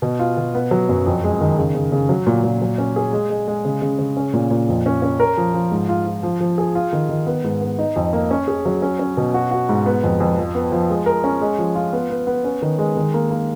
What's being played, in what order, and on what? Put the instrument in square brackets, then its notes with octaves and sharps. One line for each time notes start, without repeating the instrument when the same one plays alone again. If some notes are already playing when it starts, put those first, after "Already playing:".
[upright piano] B2
F4
B2
B3
F#3
F#2
F2
G#3
D#3
C#3
C#3
C#3
F#3
A#2
A#2
F#3
C#4
G#4
G#3
G#3
G#3
C#3
C#3
C#3
C#4
A#2
A#2
F2
C#4
C#4
A#4
F3
F3
G#2
F4
F4
F3
F3
G#4
F4
D#3
D#3
B3
G#2
B3
D#4
F2
A#3
C#4
G#4
F#3
C#4
C#4
B2
F#4
F#4
G#2
B3
F2
F2
F3
B3
F3
G#3
A#4
C#4
G#3
F3
F4
B3
B3
B3
C#4
D#3
G#3
D#3
A#3
A#3